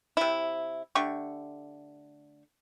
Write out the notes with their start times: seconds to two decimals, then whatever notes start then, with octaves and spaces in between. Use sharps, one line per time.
0.17 C3 E4
0.95 D3 A3 G4 C#6